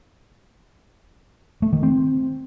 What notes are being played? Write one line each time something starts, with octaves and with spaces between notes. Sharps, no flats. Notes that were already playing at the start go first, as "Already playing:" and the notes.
A3
D#3
C4